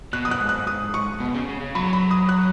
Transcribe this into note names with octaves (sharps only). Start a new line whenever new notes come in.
B2 F#6
D#6
B2 F#6
G#2
F#6
D#6
C#6
B2
C#3
C#3
C#3
F#3 B5
B5
D#6
F#6